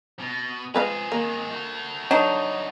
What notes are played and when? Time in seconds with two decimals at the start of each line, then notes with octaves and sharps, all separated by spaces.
0.19 B2
0.74 F3 G#3 G#4 B4 F5
1.12 D#3 G#3 A#3
1.51 A3 F#4
2.11 D3 F#3 D#4